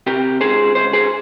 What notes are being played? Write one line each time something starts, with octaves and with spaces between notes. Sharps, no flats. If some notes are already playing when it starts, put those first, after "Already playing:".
C3 G4 A#4
C#2 G#4 C5
C#2 C5
G#4 C5